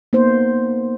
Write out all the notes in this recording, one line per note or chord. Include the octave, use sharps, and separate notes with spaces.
A#3 B3 D#4 C5